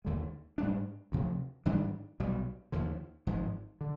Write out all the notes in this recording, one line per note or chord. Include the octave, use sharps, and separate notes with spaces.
D#2 D3 G#3
G#2 G3 D4
D2 C3 F3
G#2 D#3 G3 D4
B1 B2 G3
D#2 D3 F3
G#1 G#2 F3 G#3
D3